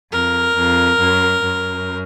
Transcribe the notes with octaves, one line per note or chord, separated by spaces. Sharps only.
F2 A#4
F2
F#2
F#2